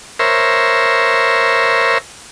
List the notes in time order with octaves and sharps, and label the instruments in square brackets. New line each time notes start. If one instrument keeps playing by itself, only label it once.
[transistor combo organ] A#4 C5 C#5 E5